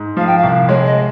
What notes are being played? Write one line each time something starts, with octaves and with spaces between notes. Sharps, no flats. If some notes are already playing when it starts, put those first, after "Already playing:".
Already playing: G#2
F3 F5
G5
F5
C2
G#3 C#5
D#5